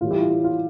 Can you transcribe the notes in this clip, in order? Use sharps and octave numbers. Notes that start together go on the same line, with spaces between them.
A2 E3 G3 F4
E4 G4
F4
F4